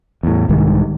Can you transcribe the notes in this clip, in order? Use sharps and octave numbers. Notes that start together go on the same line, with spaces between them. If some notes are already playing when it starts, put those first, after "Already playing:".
E2 A2
C2 G#2 D#3